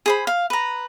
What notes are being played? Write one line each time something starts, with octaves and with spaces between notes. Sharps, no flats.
G#4 C5 B5
F5
B4 A#5